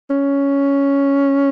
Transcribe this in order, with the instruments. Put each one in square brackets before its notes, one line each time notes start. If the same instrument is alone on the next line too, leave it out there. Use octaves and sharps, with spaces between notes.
[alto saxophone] C#4